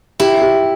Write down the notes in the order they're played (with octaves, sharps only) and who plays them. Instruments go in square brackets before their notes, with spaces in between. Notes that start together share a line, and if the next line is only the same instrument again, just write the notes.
[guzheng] E4 [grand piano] G4
[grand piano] G4